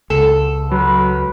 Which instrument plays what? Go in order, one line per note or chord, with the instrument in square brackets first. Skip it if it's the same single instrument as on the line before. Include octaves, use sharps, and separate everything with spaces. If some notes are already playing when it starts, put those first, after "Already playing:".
[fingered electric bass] C#2 [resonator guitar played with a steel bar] A4
[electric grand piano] F#3 [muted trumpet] B4